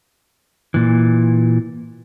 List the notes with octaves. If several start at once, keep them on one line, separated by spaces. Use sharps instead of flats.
A#2 E3